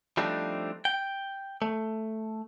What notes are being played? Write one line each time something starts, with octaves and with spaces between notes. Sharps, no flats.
F3 G3 A3 C4 D4 D#4
G5
A3